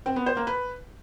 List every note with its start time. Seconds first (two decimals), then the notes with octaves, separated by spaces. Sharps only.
0.06 C4
0.16 B3
0.26 C5
0.37 A#3
0.47 B4